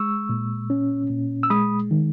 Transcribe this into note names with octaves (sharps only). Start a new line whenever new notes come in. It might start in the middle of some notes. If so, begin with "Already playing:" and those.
Already playing: G#3 C#6 E6
A#2
C#4
A#2
E6
G#3 B5 D#6
D#3